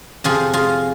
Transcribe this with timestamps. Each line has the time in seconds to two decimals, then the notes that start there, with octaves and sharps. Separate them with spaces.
0.24 F2 C3 F3 C4 F4 G#4
0.53 F4 G#4